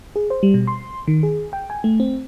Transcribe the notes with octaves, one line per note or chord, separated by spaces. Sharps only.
G#4
C5
G3
B2
C6
D#3
G#4
G5
G#5
A3
C4